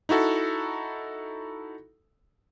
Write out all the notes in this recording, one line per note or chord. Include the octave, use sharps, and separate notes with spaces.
D#4 E4 F#4 A4